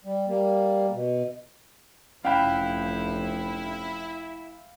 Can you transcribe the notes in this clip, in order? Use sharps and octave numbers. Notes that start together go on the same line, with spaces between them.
G3
G3 A#3
B2
F1 F3 C#4 E4 F5 G5 B5 F#6